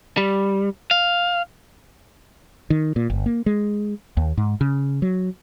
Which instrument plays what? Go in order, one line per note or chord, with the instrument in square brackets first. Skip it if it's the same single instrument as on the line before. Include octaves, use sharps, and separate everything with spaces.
[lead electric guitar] G3
F5
[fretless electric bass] D#3
A#2
G1
A#3
G#3
D#2
G#2
C#3
F#3